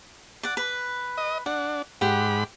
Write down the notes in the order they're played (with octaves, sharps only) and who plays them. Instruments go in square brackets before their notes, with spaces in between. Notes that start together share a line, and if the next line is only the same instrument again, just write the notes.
[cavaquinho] D5 F#5
B4
[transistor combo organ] D#5
[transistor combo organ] D4 [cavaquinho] F#5
[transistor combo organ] G#2 B5 [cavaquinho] G4 F#5